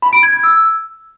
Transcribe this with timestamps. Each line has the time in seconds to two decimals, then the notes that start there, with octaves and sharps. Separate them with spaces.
0.02 B5
0.13 D7
0.23 G#6
0.33 G#6
0.43 E6